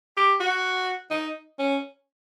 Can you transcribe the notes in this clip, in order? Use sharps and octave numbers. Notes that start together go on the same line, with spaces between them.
G4
F#4
D#4
C#4